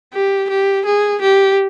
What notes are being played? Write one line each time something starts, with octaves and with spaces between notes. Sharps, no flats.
G4
G4
G#4
G4